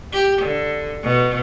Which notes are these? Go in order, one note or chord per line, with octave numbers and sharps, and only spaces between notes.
G4
D3
B2